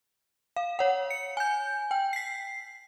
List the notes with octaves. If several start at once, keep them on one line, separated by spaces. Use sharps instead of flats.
F5
C#5 F#5
C#7
G#5 G6
G5
B6 C7